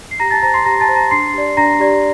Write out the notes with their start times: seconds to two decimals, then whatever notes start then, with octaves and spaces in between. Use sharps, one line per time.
0.11 C7
0.20 G4 A#5 A#6
0.31 A5 A6
0.43 C5 A#5 A#6
0.54 C6 C7
0.65 G4 A#5 A#6
0.80 A5 A6
0.89 C5
0.96 A#5 A#6
1.11 D4 C6 C7
1.34 G4 D5
1.57 D4 A#5 A#6
1.80 G4 D5